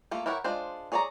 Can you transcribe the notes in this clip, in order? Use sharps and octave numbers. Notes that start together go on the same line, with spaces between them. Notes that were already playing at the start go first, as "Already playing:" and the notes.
A3 A#3 F4
E4 G4 A#4 C#5 F#5
G#3 D4 F4 C5
G#4 C#5 D5 G#5 A#5